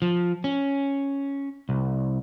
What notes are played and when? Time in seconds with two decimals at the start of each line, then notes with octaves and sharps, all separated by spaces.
0.02 F3
0.44 C#4
1.69 C2